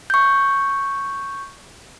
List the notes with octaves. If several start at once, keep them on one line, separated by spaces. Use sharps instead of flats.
C#6 G6